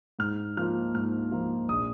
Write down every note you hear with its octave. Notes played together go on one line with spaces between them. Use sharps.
G#2 F6
F3 A#3 F4 F6
G#2 F6
F3 A#3 F4
A#1 D#6